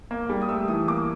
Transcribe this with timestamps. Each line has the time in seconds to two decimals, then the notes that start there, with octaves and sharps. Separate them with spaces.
0.11 A#3
0.29 G3
0.42 D#6
0.49 A3 E6
0.68 E3 D#6
0.88 A#3 D6